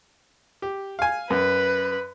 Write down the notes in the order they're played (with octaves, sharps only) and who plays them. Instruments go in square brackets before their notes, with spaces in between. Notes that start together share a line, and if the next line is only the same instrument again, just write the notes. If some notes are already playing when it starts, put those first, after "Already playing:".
[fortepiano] G4
F5 G#5
[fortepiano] F#2 [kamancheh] B4